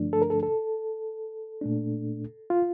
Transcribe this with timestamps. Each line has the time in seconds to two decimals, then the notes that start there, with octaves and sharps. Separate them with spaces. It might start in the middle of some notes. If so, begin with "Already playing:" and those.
Already playing: G2 D3 F3 A3 D4
0.13 A4
0.22 A#4
0.30 A4
0.43 A4
1.61 A#2 A3 D4
2.50 F4